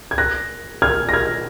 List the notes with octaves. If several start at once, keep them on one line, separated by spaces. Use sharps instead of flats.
G#6
F#6 A#6
F6 G#6
A#6
F6 G#6